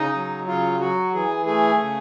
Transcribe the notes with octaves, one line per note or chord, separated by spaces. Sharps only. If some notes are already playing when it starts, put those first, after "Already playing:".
Already playing: C#3 D#4
F#3
C#3 F4
F#3 F#4
E3 G#4
A3 G#4
C#3